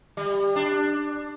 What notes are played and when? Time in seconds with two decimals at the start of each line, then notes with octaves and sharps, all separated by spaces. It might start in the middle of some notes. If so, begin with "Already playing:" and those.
0.17 G3
0.56 D4